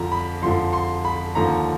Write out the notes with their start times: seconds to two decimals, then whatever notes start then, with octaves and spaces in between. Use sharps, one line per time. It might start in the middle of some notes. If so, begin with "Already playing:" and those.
Already playing: F2 D3 F3 A#5
0.12 B5
0.42 F2 D3 F3 C6
0.73 C6
1.05 B5
1.35 D#2 D3 F3 A#5